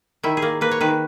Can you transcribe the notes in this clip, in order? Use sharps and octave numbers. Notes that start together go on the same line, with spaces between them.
D#3 E4
G#4
A#3
A#3 B4
C#5
D#3 B4